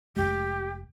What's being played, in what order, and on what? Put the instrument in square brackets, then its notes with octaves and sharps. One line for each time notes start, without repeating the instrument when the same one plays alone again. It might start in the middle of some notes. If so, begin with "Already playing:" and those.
[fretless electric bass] F1 E2 G#3 [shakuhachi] G4